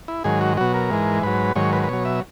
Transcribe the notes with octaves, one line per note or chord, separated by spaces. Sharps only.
E4
G#2 D#3 F#3 G#4
F#4
B2 F#3 F#4
A#4
G#2 E3 G#3
G#2 F#3 B4
G#2 D#3 F#3 C#5
B4
B4
B2 F#3 C#5
E5